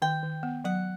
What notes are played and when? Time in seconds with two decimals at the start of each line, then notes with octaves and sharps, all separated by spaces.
0.02 D#3 G5
0.23 D#3
0.43 B3
0.65 F#3 F#5